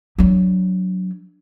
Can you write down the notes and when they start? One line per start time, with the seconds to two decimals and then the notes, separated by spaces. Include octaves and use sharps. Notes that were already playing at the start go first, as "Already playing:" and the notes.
0.18 F#3 D4